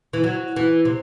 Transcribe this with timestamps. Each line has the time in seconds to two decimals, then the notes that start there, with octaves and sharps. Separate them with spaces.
0.13 E3
0.24 F#3
0.56 E3
0.85 C3